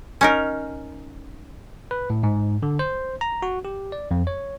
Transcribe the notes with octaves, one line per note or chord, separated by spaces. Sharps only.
C#4 D#4 A#4
B4
A2
G#2
D3
C5
A#5
F#4
G4
D5
F2
C#5